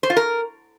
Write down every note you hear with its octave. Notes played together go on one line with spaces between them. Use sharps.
C5
F4
A#4